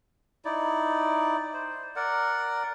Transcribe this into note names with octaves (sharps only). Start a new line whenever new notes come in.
D#4 E4 D5
C5
A#4 D5 F#5